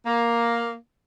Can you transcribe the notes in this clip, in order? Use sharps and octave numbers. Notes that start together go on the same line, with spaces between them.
A#3